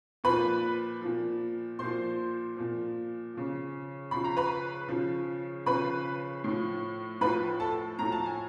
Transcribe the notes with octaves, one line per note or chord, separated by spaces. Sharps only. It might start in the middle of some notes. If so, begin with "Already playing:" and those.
A#2 F3 B4 B5
A#2 F3
A#2 F3 C5 C6
A#2 F3
C#3 F3
C#3 F3 B5
A#5
B4 B5
C#3 F3
C#3 F3 B4 B5
A2 F3
A2 F3 B4 B5
A4 A5
A2 F3 A#5
A5
G#5